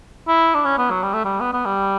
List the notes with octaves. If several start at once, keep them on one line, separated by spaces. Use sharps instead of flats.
E4
D4
C#4
B3
F#3
G3
A3
G3
B3
B3
G3